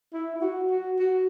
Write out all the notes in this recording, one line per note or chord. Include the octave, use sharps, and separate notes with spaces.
E4
E4
F#4
F#4
F#4